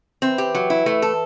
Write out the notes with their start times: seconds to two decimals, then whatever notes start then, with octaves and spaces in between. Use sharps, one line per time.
0.22 E3 C4
0.38 G4
0.55 F#3
0.70 E4
0.86 E3 A3
1.02 A4